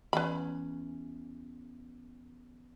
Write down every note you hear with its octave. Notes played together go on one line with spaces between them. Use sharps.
E2 C#4 B4 B5